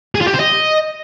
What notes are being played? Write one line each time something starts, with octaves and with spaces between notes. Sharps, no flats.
G#4
F4
G4
C5
D#5